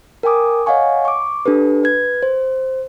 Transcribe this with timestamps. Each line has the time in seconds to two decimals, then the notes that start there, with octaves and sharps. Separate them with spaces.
0.23 A#4 G5 G#5 D6 D#6
0.66 C#5 D#5 F5 F#5 G#5 C#6
1.05 C#6 D6
1.46 D4 G4 A4 B4
1.83 B4 G#6
2.23 C5